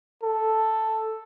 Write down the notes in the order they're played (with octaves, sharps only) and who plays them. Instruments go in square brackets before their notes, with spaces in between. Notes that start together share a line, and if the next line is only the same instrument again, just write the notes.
[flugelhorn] A4